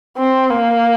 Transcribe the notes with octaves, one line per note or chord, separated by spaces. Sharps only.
C4
A#3